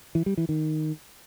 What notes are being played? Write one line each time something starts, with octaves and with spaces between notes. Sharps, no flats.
E3
G3
E3
D#3